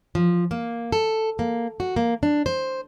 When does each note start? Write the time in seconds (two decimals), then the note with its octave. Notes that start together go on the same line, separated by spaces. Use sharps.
0.15 F3
0.51 A#3
0.92 A4
1.39 A#3
1.80 F#4
1.96 A#3
2.23 D4
2.46 C5